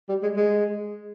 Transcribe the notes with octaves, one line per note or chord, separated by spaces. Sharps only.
G3
G#3
G#3